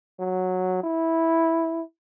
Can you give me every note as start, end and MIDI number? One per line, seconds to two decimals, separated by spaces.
0.20 0.79 54
0.84 1.82 64